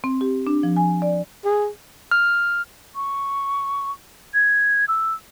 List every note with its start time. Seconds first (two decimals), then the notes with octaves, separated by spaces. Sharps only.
0.04 C4
0.21 G4
0.47 D4
0.63 F3
0.77 G#5
1.02 D5
1.45 G#4
2.11 F6
2.95 C#6
4.34 G#6
4.88 E6